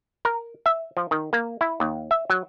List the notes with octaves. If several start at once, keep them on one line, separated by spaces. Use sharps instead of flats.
A#4
E5
F3
D#3
A#3
E4
D#2
E5
F#3